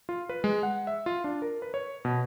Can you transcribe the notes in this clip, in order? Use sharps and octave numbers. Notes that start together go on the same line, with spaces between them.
F4
B4
G#3
F#5
E5
F4
D4
A#4
B4
C#5
B2